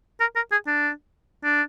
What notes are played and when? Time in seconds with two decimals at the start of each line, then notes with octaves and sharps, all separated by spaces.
0.20 A#4
0.35 A#4
0.52 G#4
0.67 D4
1.44 D4